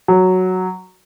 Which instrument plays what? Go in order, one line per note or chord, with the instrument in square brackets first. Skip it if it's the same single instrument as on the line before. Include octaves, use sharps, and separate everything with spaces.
[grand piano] F#3